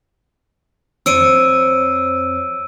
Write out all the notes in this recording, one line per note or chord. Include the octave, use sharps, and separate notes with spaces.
F2 C5 C#5 E6 D7 D#7